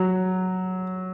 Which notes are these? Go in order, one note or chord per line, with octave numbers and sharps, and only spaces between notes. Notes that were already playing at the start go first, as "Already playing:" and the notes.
Already playing: F#3